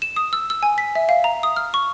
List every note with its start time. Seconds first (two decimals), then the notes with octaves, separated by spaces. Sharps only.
0.02 E7
0.16 D#6
0.33 E6
0.50 E6
0.63 G#5
0.78 B6
0.95 E5
1.09 F5
1.24 A#5
1.43 D#6
1.56 F6
1.74 C#6